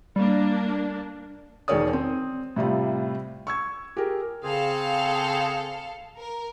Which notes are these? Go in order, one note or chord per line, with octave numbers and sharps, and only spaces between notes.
G3 A#3 D4
E1 D#3 G#4 C#5 D5 D#6
C4
A2 C3 G3 F4
C#6 E6 G#6
G4 G#4 A#4
C#3 C4 G#4 A4 F5
A#4